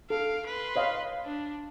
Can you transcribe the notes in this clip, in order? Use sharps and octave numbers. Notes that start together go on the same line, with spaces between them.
A4 F5 D7
B4 C6
C#5 D#5 F5
D4